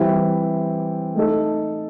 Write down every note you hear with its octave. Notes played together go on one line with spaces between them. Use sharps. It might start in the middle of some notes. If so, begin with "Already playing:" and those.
Already playing: E3 G3 C4 E4 G4
A3 D#4 A4